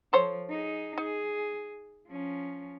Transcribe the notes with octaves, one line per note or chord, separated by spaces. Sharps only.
F3 A4 C5 C#5
D#4 G#4
D#4 G#4
F3 C#4